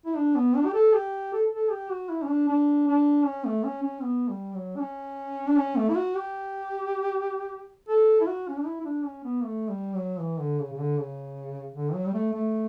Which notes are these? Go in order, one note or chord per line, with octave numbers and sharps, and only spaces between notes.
E4
D4
B3
D4
G4
A4
G4
A4
A4
G4
F#4
E4
C#4
D4
D4
D4
C#4
A3
C#4
C#4
B3
G3
F#3
D4
C#4
D4
C#4
A3
E4
F#4
G4
A4
E4
F#4
C#4
D4
E4
E4
D4
C#4
B3
A3
G3
F#3
E3
D3
C#3
C#3
D3
C#3
D3
F#3
G3
A3
A3